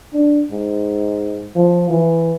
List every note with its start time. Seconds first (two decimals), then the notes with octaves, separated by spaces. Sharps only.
0.13 D4
0.51 G#2
1.56 F3
1.90 E3